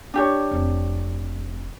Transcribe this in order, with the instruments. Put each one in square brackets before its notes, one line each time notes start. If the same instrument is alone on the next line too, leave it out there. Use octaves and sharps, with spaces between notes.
[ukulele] D4 G4 C#5
[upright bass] F1 C4